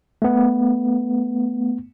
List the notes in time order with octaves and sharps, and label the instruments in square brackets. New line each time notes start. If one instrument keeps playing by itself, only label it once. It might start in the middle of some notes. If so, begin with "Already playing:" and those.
[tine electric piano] A3 B3